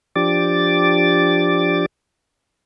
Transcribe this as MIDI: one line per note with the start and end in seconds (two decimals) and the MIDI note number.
0.16 1.86 53
0.16 1.86 62
0.16 1.86 67
0.16 1.86 86
0.16 1.86 93